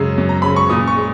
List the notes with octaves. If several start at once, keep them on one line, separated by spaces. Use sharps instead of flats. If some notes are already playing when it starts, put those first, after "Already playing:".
Already playing: F#2 C#3 G#3 E6
F#2
A#5
C#3 G#3 B5
C#6
A#2 D#6
C#6
G#3